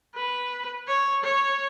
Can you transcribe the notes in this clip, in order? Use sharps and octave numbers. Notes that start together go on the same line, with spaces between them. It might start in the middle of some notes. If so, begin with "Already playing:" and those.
B4
C#5
C#5